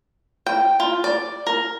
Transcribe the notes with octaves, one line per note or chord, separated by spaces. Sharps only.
G5
F4
D5
A#4